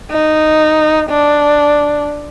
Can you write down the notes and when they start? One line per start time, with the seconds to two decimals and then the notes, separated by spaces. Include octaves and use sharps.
0.11 D#4
1.10 D4